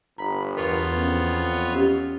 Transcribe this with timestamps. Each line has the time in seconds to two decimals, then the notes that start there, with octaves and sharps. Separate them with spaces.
0.18 G1 A#5 B5
0.57 E2 B3 F4 A#4 C#5
0.97 F2 C#4
1.72 C#4 G4